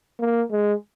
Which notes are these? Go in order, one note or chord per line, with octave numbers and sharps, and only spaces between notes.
A#3
G#3